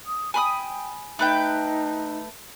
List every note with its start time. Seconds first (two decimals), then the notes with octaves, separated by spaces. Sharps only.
0.06 D#6
0.34 G5 G#5 B5 D#6
1.19 A3 D#4 B4 G5